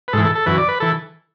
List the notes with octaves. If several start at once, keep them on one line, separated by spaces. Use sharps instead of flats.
B4
G#2 E3 A4
A4
A4
F#2 E3 B4
D5
B4
E3 A4